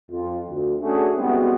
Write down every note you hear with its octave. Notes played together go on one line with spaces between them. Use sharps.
F2 F4
D2
A3 C#4 D4 F#4 G#4
G3 G#3 B3 C4 E4 F#4